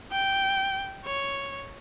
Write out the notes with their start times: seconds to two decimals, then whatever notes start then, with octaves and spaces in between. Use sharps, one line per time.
0.11 G5
1.05 C#5